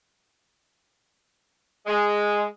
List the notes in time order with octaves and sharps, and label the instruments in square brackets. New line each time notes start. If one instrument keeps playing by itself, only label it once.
[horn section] G#3